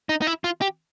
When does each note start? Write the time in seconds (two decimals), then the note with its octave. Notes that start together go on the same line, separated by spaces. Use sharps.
0.09 D#4
0.22 D#4
0.27 E4
0.44 F4
0.61 G4